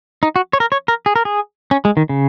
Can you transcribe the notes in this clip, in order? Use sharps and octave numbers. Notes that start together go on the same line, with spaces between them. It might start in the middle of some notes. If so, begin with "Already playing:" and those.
D#4
F#4
C#5
A#4
C#5
A#4
G#4
A#4
G#4
C#4
G#3
D#3
C#3